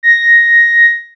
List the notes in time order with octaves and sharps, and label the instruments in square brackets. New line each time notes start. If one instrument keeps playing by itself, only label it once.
[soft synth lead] A#6